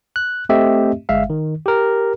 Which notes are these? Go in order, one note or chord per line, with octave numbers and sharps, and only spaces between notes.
F#6
A3 C4 G4 D#5 E5
G1 G#3 E5 F5
D#3
G4 A#4